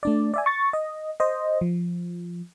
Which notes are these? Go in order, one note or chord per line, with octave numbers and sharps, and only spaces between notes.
A3 D4 D5
D5 E5 G#5
C#6 A6
D#5
C5 D#5
F3